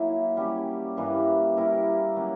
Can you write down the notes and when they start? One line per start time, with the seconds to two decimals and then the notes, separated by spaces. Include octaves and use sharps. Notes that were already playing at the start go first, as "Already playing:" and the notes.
Already playing: F#3 A#3 E4
0.37 G3 C#4 G4
0.97 G2 E3 G3 A#3
1.57 G3 A#3 E4 A#4
2.16 F#3 A#3 C#4